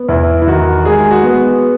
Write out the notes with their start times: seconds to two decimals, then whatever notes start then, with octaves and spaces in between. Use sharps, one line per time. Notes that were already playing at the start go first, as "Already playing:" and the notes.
Already playing: B3
0.09 E2 E4
0.42 E4
0.47 D#3 F#4
0.85 G#3 G#4
1.11 F#4
1.24 B3